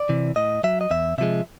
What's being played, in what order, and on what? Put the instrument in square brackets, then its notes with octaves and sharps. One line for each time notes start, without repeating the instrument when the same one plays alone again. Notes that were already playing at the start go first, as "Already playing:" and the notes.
Already playing: [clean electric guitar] D5
C3 E3
A2 D#5
F#3 E5
D#5
E2 E5
C3 F3 G#3 E5